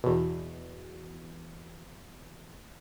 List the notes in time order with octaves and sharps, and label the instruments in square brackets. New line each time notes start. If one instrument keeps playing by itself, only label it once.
[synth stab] E2 B2